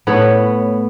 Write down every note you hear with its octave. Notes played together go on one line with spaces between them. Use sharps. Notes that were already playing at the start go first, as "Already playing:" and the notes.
A2 B3 B4 C#5